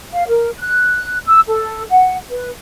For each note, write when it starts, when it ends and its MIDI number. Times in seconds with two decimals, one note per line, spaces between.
0.13 0.27 77
0.28 0.50 70
0.59 1.18 90
1.26 1.40 88
1.48 1.83 69
1.91 2.15 78
2.31 2.48 71